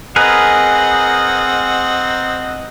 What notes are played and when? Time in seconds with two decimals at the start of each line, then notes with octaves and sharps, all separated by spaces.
0.16 C4 G#4 A#4 B4 D#5 F#5